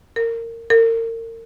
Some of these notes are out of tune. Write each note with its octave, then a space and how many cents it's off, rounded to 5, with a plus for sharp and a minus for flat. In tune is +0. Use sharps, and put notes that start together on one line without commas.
A#4 -20
A#4 -35